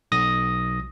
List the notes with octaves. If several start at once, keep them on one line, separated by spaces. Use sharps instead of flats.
B1 D#6 A#6